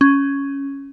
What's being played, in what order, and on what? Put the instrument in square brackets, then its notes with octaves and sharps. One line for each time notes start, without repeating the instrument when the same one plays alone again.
[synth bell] C#4